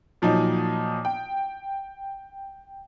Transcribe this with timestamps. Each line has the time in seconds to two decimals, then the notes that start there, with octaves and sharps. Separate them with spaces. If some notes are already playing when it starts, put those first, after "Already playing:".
0.22 A#2 F3 F#3 D#4
1.05 G5